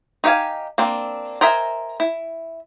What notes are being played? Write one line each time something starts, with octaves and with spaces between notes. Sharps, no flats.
D#4 G4 E5 F5 G#5
A#3 C4 D4
A#4 C5 D#5 E5 G#5
E4